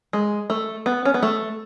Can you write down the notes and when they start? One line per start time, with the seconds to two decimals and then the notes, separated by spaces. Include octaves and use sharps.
0.13 G#3
0.50 A3
0.86 B3
1.05 C#4
1.14 B3
1.22 A3